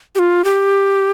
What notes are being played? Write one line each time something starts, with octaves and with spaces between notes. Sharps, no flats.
G4
F4
G4